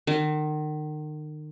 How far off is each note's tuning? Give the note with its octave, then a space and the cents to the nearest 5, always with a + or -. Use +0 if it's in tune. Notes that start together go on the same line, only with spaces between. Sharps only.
D#3 -35